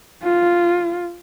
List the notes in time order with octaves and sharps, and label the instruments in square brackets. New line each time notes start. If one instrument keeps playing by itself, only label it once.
[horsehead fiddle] F4